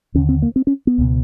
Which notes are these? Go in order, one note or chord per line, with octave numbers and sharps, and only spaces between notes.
D#2 D3 C#4
C4
A#3
C4
C#4
B3
C#2 B2